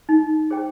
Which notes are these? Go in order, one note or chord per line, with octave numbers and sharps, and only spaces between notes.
D#4
G#4 C5 G5